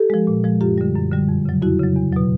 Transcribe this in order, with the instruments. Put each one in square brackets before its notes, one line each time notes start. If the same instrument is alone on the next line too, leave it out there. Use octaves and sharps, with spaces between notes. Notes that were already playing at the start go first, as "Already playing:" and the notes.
Already playing: [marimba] G4 A4
F3 G#3
A#2
F3 G#3
F#2 F4 G4
D3 G3
F#2
D3 G3
F2
C#3 F#3
F2 E4 F#4
C#3 F#3
E2
B2 F#3